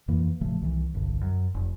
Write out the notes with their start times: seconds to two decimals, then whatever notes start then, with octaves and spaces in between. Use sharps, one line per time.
0.08 F2 E3 A#3
0.41 A1 C#3 F3 A3
0.62 C2 D#3 E3
0.94 G1 C2 G2 D3
1.21 F#2
1.54 F1